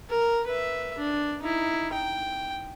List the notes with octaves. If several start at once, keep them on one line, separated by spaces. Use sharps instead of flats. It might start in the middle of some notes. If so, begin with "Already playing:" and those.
A#4
B4 E5
D4
D#4 E4
G5